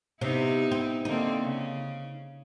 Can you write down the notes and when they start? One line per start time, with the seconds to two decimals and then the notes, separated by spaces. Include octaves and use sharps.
0.21 C3 B3 D#4 E4
0.71 C4
1.05 D3 A#3 C4 D#4
1.42 C#3